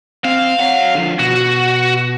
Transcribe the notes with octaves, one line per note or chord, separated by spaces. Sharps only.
C4 F5
C#5 F#5
D3 F3
B2 F#4